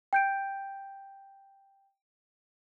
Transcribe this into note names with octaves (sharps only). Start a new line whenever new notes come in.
G5 G6 D7